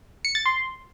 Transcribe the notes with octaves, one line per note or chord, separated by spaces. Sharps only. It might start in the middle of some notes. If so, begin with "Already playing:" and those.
C#7
A6
C6